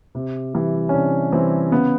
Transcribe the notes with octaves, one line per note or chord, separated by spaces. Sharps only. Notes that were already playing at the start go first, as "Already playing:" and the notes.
C3
E3 G3
C#4
C3 D4
E3 G3 C4
C#3 B3